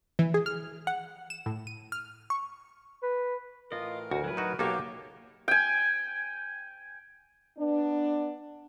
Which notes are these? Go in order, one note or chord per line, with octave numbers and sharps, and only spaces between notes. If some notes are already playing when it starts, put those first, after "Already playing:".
E3
G#4
F6
F#5
E7
A2
D#7
F6
C#6
B4
A2 E3 F4 A#4 D#5
D2 F#4
F#3 B4
D#4 F#4
B1 A#3 F#4 G4 A4 C#5
G5 G#5
B3 D4